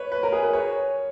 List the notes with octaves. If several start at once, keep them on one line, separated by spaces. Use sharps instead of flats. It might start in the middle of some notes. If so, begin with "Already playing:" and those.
Already playing: B4 C#5
B4
A#4
G#4
B4
C#5